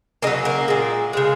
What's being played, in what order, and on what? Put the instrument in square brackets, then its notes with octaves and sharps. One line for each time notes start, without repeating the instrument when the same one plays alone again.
[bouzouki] C#3 A#3 D#4
F#3
A#3
A#2 G#3
C#3 G#3